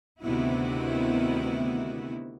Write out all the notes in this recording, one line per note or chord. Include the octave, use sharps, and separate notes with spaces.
D2 C3 D#3 B3 E4 F#4